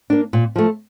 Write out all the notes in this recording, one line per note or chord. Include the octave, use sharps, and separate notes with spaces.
A#3 D4
A#2
F3 A3